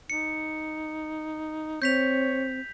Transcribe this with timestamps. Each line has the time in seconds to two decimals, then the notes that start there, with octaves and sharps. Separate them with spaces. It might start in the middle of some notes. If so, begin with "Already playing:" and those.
0.10 D#4 C#7
1.82 C4 C#5 G6 B6 F7